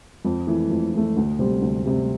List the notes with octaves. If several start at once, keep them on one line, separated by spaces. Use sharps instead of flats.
F2
E3 A3
F2
E3 A3
D2
C3 G3 C4 G4
D2
C3 G3 C4 G4